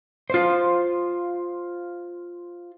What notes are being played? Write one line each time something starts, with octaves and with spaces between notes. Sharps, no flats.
F4 C5